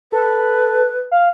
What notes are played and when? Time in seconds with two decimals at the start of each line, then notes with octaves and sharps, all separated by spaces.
0.12 A4 B4
1.11 F5